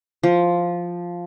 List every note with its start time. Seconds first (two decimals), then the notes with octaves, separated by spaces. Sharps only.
0.23 F3